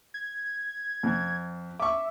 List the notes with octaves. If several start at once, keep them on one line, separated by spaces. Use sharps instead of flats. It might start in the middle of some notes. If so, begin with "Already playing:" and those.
G#6
F2
E5 C#6 D6